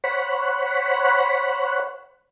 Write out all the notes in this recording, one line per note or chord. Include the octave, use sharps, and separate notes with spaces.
C5 C#5 F#5 B5